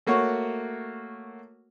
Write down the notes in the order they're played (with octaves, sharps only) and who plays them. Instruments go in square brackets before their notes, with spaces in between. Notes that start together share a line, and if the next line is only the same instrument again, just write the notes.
[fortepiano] A3 A#3 F#4 C#5 F#5